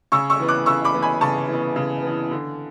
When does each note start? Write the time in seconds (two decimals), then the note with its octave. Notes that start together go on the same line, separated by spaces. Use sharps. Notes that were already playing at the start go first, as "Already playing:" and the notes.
0.12 C#3 C#6 E6
0.30 C#6 E6
0.40 E3 B3
0.48 D6 F#6
0.66 C#3 C#6 E6
0.85 B5 D6
0.94 E3 B3
1.02 G#5 B5
1.21 C#3 A5 C#6
1.48 E3 B3
1.76 C#3
2.03 E3 B3
2.31 D3